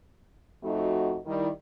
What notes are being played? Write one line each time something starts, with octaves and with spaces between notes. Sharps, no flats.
F2 A3 D#4 F#4
D#3 G3 E4